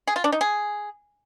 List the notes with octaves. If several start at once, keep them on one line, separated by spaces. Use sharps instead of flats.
G#4
F4
D4
D#4
G#4